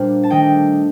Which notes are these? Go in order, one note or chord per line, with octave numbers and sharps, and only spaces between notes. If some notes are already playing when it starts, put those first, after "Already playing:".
Already playing: A#2 G3 A#3 D4 C5
A5
D#3 A3 D4 D#5 G5